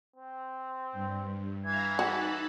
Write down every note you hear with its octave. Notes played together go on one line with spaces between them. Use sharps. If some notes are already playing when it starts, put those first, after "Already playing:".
C4
G2
E3 E5 F5 A#5 G#6
D#4 F#4 A5 B5